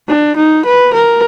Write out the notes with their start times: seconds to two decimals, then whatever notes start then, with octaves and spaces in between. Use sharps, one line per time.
0.08 D4
0.37 D#4
0.66 B4
0.94 A#4